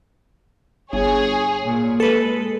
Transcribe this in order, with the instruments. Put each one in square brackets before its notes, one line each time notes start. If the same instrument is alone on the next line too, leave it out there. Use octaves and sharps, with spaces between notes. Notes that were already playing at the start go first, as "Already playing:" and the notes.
[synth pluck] G1 [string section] G#4 C#5
[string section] A#2
[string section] G#3 [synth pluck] A4 B4